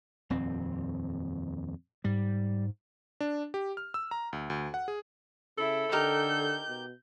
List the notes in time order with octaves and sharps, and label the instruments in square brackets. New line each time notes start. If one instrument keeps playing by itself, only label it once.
[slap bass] D#1 F2 C4
[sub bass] G#2 [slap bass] G3
[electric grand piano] D4
G4
F6
E6
A#5
D2
D2
F#5
G#4
[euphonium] C#3 [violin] E4 [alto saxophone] A4
[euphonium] D3 [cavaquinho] D#4 G4 A#4 [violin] G6
[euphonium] B2